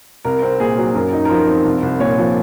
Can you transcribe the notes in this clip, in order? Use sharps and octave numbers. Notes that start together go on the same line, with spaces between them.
C2 A#4
C4
A#2 G#4
F#3
F#2 A#4
D#4
A#4
F3 C5
C4
C2
C2
A#2 C#5
F3